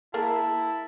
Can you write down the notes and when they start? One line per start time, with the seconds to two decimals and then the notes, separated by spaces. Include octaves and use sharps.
0.14 A#3 E4 G#4 A#4 A5